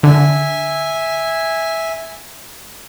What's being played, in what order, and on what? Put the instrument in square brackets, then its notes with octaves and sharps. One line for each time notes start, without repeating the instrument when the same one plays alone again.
[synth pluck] D3 [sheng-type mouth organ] E5 G#5